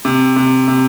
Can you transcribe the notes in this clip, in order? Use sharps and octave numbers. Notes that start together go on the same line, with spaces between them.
C3
C3
C3